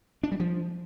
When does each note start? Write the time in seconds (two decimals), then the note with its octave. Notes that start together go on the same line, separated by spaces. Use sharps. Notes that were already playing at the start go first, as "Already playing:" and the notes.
0.23 D4
0.32 G3
0.40 F3